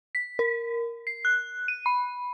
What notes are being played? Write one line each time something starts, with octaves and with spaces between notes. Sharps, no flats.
B6
A#4
C7
F#6
D#7
B5